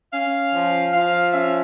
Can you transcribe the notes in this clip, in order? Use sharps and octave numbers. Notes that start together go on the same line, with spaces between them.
C#4 F5
F3
F3 F5
C#4 E5